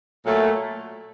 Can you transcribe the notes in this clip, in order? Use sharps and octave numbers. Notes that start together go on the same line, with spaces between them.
A#2 F#3 A3